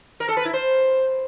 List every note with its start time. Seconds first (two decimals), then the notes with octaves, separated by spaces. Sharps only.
0.20 A#4
0.29 A4
0.37 B4
0.45 E4
0.53 C5